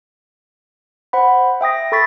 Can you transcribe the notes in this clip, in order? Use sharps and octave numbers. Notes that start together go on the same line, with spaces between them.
C5 F#5 B5
E5 G5 D#6 A#6
A4 B5 C#6 A6 B6